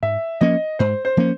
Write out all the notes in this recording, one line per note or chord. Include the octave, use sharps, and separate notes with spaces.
G#2 E5
F3 A#3 C#4 D#5
G#2 C5
C5
F3 A#3 C#4